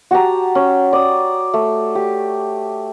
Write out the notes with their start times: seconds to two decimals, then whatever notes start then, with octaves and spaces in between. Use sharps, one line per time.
0.11 F#4 G4 A5 A#5
0.55 C#4
0.93 D5 D#6
1.54 A3
1.95 G4